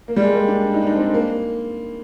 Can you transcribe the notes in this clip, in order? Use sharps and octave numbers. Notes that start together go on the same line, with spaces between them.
A#3
G3
G#3
A#3
D4
D#4
D4
D#4
C4
D4
A#3